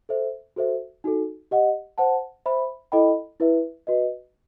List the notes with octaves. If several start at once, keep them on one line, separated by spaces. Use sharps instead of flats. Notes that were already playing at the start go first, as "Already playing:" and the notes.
A4 C5 E5
F#4 A4 C5 E5
D#4 F#4 A4
G4 D#5 F#5
C5 F#5 A5
C5 E5 B5
E4 A4 D#5 G5 B5
E4 B4 E5
F#4 B4 D#5